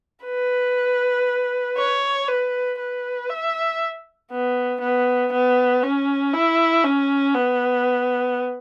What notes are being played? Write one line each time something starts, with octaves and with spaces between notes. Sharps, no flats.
B4
C#5
B4
B4
E5
B3
B3
B3
C#4
E4
C#4
B3